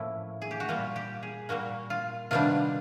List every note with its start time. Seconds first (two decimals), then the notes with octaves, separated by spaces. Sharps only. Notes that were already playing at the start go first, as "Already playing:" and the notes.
Already playing: A2 F3 A#3 C#4 E4
0.42 G#4
0.51 G4
0.60 F#4
0.69 A#2 G3 A#3 F4
0.96 G4
1.23 G#4
1.49 A#2 G3 A#3 F#4
1.90 F4
2.31 C3 D#3 G3 B3 D4 F4